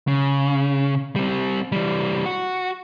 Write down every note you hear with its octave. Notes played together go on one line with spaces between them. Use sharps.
C#3
G3 C4
E3 G3
F#4